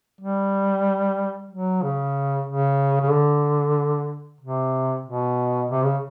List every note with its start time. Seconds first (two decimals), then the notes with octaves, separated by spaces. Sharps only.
0.21 G3
1.51 F#3
1.83 C#3
2.47 C#3
3.01 C#3
3.11 D3
4.41 C3
5.06 B2
5.71 C3
5.84 C#3